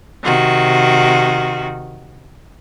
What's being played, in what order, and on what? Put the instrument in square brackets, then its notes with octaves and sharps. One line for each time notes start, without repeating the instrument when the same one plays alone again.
[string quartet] C3 D#3 F#4